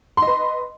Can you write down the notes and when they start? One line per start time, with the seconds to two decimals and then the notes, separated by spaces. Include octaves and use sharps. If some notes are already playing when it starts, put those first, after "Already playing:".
0.17 C6
0.22 D#5
0.27 B4